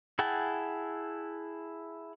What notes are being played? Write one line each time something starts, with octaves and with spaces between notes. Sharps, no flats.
E4 G#4 F#5 G5 A5